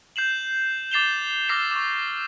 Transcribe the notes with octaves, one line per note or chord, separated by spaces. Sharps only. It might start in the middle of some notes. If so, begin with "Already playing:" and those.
G6 C7 E7 F#7
D6 A6 C7 E7 F7 G7
D6 E6 F6 A#6 C7 G7
C#6 D6